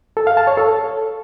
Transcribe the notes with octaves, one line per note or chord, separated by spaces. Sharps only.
A4
F5
A5
C#5
A4